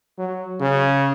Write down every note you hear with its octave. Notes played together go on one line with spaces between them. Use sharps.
F#3
C#3